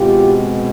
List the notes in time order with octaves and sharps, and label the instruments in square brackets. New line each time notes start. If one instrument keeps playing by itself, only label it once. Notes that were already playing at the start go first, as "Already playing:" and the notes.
Already playing: [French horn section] B2 G#3 C4 F4 G4